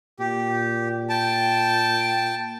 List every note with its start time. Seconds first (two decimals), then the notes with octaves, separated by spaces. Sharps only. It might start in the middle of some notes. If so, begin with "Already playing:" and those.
0.19 A#2 G4
1.10 G5 A5